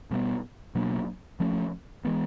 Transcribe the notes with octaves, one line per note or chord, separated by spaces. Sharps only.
B2 G3 B3
B2 F#3 A#3 D4
F3 A3 C#4
E3 G#3 B3